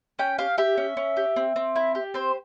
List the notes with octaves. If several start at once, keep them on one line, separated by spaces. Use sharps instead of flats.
C#4 G5
G4 F5
G4 E5
C#4
C#4
G4
C4
C4
E4
G4
C4 C5